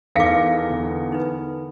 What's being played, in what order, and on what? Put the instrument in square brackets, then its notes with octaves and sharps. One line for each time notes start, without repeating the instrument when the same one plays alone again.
[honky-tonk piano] E2 A#6 C#7 [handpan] D#4 A4 A#4 [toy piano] F5 D6
[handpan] D3 B3
[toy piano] D#4 B4